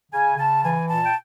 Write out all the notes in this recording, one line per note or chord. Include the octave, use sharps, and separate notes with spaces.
C#3 G#5
C#3 A5
E3 G#5
A#2 A5
G5